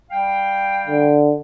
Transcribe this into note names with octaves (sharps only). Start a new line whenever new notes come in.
G3 F5 G5
D3